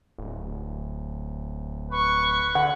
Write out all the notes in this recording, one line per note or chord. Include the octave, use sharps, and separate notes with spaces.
D1
B4 C#6
D3 F#5